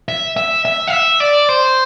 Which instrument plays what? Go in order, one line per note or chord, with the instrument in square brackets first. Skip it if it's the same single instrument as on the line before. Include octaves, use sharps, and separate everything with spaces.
[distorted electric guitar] E5
E5
E5
F5
E5
D5
C5